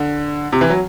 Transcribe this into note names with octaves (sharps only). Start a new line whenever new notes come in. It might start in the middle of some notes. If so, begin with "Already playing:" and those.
Already playing: D3
C3
E3
F#3